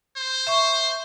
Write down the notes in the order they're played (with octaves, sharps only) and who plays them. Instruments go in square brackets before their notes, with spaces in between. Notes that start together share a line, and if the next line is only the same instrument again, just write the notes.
[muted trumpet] C5
[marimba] E5 C#6